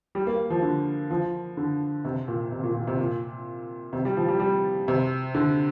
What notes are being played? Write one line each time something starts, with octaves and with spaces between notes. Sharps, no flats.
G3
A#3
F3
D3
F3
D3
C3
A#2
C3
A#2
A#2
C3
A#2
C3
G3
F3
G3
G3
C3
D3